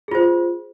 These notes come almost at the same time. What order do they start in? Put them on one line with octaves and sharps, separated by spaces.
G#4 F4 C5